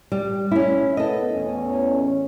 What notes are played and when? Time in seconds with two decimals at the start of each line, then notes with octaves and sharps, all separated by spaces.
0.12 G3
0.51 C#4 E4
0.97 B3 A4 D#5
1.33 E2 A2 C#4